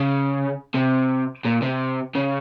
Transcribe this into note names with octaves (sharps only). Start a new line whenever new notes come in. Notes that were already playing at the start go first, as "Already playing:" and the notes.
Already playing: C#3
C3
A#2
C3
C#3